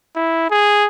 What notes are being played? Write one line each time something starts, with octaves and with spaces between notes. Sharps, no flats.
E4
G#4